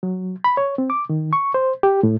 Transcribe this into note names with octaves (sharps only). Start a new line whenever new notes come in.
F#3
B5
C#5
C4
D6
D#3
C#6
C5
G4
A2